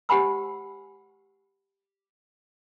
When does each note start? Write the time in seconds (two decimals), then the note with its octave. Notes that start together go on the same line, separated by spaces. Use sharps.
0.09 G4 C5 F#5 G#5 B5 E6